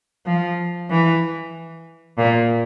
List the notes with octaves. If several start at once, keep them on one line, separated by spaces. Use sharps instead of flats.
F3
E3
A#2